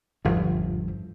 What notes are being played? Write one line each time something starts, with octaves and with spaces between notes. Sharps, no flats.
G1 E2 G#2 F3